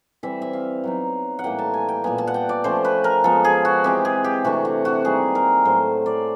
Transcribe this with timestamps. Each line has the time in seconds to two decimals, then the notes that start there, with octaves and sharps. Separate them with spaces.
0.23 E3 G3 C4 E4 E5
0.42 E5
0.53 F5
0.84 F#3 B3 D#4
1.39 F#5
1.44 A2 E3 G3 A#3 G5
1.59 A5
1.74 G#5
1.89 G5
2.04 A#2 G3 B3 G#5
2.18 A5
2.27 F#5
2.34 G5
2.49 D5
2.64 F3 A3 C#4 C5
2.85 B4
3.04 A#4
3.24 F3 G#3 B3 A4
3.45 G#4
3.65 F#4
3.84 E3 G#3 C4 G4
4.05 G#4
4.24 G4
4.44 C3 E3 A3 D4 F#4
4.65 F#4
4.85 F#4
5.05 D#3 G3 A#3 G#4
5.35 A#4
5.65 A2 F#3 A3 C5
6.06 D5